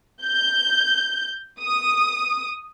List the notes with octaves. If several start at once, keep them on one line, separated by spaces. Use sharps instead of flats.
G6
D#6